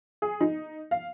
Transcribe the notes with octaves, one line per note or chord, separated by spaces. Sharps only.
G#4
D#4
F5